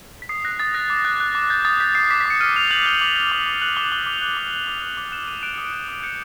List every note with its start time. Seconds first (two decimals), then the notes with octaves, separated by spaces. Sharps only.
0.22 B6
0.29 D#6 C7
0.45 F#6 A#6
0.59 D#6 A6
0.74 F#6 A#6
0.90 D6
1.05 F#6
1.20 F#6
1.35 D6
1.50 G6 A6
1.65 D#6 A6
1.80 G6 B6
1.95 D#6 C7
2.10 D6 B6
2.20 B6
2.26 D6 C#7
2.40 F6 D#7
2.56 F6 F7
2.71 G6 F#7
2.86 G6 G7
3.01 D6
3.16 G6
3.32 D6
3.46 D6
3.62 F#6 F#7
3.76 D6 G7
3.91 D6 G7
4.06 D6 F7
4.22 F#6 F#7
4.37 D6
4.52 G6
4.67 D6
4.82 D6 F7
4.97 D6
5.12 F#6 E7
5.27 F#6 D#7
5.43 F#6 D7
5.53 D#6 C#7
5.64 D7
5.73 G6
5.88 D#6
6.03 G6 C#7